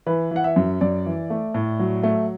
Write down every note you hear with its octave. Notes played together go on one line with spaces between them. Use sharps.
E3 B4
E3 F#5
E5
F#2
F#2 D5
E3
A3
A2
F#3
A3